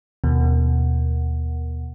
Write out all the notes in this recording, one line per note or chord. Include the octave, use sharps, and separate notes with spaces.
D#2 B2